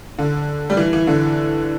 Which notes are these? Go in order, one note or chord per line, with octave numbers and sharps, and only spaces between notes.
D3
G3
E3
E3
D3